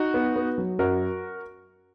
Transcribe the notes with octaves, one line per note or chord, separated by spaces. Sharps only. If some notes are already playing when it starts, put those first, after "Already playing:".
Already playing: D#4 F#4
B3
B3
F#3
F#2 F#4 A#4